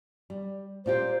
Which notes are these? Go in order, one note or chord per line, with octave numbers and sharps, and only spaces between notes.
G3
A#2 F4 G4 C5